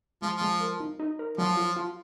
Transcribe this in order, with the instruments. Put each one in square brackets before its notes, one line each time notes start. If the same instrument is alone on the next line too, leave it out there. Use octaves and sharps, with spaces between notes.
[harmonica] F3 [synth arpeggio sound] G#3
[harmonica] F3 [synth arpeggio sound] G#3
[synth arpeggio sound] A#4
D#4
D#4
A#4
[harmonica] F3 [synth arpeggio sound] F#3
[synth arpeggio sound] F4
F4